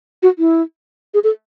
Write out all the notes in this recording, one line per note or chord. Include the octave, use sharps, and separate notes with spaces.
F#4
E4
G#4
A4